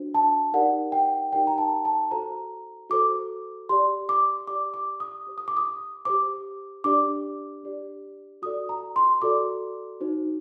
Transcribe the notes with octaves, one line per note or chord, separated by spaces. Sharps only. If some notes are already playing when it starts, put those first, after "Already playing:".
Already playing: D4 F#4 C5
A5
D#4 G4 A#4 D5 F#5
G5
D#4 G4 A#4 D5 G5
A#5
A5
A5
F#4 A4 C5 A#5
F#4 A4 C5 D6
G4 D5 C6
D6
G4 D5 D6
D6
D#6
G4 C5
D#6
D6
D#6
G4 C5 D6
D4 G4 D5 D6
D4 G4 D5
F#4 A4 D5 D#6
A#5
C6
F#4 A4 D5 D6
D#4 F#4 C5